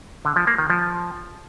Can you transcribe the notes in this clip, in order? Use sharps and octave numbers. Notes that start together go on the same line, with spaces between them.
D3
F3
A#3
D#3
F3